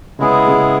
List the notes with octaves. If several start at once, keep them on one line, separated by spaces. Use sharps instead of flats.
C#3 G#3 B3 E4 G#4
C#3